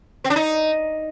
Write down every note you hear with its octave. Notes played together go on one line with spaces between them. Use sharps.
C4
D4
D#4